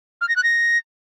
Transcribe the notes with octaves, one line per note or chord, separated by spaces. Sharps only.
F6
A#6
F#6
A#6